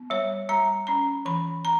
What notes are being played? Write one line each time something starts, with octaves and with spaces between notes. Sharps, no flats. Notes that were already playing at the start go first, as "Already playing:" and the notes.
Already playing: B3
G3 C#5
G3 A#5
C#4 A#5
E3 B5
A#5